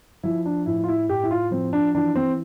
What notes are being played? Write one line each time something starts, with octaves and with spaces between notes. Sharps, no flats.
F3 E4
D4
A2 E4
F4
E4
A2 G4
E4
F4
F3 C4
D4
E3 D4
C4